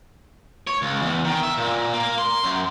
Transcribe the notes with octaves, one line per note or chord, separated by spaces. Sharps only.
C#5
C#2
E2
D#3
E5
A#2
A#3
C6
F#2